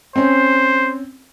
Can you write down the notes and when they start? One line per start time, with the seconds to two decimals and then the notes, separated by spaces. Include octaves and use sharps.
0.16 C4 C#4 C5